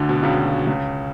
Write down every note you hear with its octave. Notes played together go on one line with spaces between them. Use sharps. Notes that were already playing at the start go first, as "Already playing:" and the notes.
Already playing: D2 D3
B2
C#2 C#3
C#2 C#3